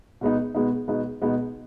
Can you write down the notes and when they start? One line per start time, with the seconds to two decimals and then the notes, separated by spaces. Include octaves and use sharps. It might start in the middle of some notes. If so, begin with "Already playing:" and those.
0.21 B2 G#3 B3 D#4
0.55 B2 G#3 B3 D#4
0.88 B2 G#3 B3 D#4
1.22 B2 G#3 B3 D#4